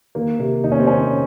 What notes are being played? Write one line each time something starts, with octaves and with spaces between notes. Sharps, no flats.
D#3 A#3
C3 A#3
D#3 D#4
C#4
C4
D#3 C#4